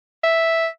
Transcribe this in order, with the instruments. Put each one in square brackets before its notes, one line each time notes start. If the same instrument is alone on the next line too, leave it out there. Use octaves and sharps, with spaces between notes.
[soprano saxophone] E5